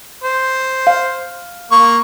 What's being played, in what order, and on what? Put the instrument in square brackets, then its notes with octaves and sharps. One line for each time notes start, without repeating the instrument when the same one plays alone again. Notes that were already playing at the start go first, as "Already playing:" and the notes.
[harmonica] C5
[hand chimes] F5
[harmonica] A#3 C#6